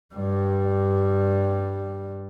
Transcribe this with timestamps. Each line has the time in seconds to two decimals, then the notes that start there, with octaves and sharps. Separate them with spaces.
0.15 G2 G3